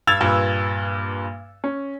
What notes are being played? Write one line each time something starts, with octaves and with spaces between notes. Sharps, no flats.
G2 E6 G#6 A6 F7
G2 A#2 B4
C#4